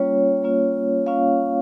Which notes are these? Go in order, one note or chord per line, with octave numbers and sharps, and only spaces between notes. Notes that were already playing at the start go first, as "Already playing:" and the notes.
Already playing: G3 A#3 C#4 F4 C#5
G3 A#3 C#4 F4
G3 A#3 C#4 F4 F5